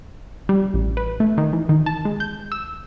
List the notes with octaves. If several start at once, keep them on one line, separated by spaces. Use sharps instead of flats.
G3
A1
B4
A3
D#3
E3
D#3
A5
G#3
G6
E6